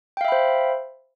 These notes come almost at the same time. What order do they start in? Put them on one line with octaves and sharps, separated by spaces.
G5 F5 E5 B5 C5